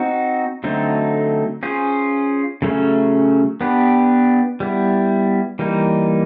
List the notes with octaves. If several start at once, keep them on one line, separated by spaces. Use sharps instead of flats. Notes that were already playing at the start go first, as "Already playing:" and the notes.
Already playing: C4 D#4 F#4
D3 F#3 A3 C4 D#4
C#4 F4 G#4 C5
C#3 F#3 A3 C#4
B3 D4 G4 B4
G3 B3 E4
E3 G3 A#3 D#4